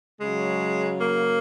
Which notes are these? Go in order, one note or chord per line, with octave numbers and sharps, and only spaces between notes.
C#3 F#3 G#3
A#3